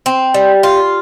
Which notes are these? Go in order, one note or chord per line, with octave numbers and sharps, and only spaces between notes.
C4
G3
F4